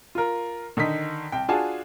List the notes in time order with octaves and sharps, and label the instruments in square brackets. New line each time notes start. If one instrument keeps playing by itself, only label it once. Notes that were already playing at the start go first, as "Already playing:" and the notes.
[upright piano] F4 A#4
D3 D#3 D#4 B6
C2 G5
D4 F4 F#4 G#4 G#5 A5